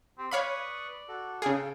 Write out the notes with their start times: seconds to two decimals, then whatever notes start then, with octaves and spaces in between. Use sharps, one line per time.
0.18 C4 G4
0.31 B4 C#5 D5 F5 B5 C#6 D#6
1.08 F#4 A4
1.42 C#3 G#4 A4 F5 G5